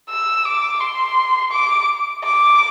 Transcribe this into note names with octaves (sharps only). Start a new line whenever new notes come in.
E6
D6
C6
D6
D6